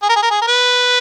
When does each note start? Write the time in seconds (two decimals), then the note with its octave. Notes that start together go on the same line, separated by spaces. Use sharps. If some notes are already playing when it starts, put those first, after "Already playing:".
0.02 G#4
0.09 A#4
0.16 G#4
0.22 A#4
0.30 G#4
0.41 A#4
0.47 B4